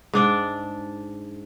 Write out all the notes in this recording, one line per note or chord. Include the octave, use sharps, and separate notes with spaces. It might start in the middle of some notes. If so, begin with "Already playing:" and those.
G#2 D4 D5